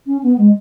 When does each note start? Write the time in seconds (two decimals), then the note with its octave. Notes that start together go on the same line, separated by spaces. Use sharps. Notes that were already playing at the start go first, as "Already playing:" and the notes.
0.07 C#4
0.23 B3
0.38 G#3